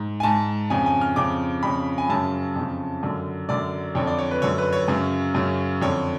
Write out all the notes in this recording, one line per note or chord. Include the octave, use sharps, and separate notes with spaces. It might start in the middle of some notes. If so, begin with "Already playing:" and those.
Already playing: G#2
G#5
G#2 A5
F2 C#3 G#5
G#5
F6
F2 C#3 D6
F2 C#3 B5
G#5
F#2 C#3 A5
F2 C#3
F#2 D3
F#2 D3 D5
F2 D3 C#5
D5
C#5
B4
F#2 D3 C#5
B4
C#5
F#2 C#3
F#2 C#3
F2 D3 C#5